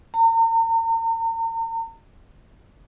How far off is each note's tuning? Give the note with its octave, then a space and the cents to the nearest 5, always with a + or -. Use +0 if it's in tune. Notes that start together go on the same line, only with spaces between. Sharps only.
A#5 -40